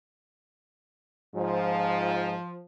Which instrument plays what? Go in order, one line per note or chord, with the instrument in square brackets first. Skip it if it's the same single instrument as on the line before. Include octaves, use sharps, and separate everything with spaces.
[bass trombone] G#2 [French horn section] F3